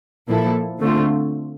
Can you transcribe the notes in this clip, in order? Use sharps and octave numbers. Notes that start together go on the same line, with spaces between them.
A#2 F3 A#3 E4 A4
D3 A3 C4 F4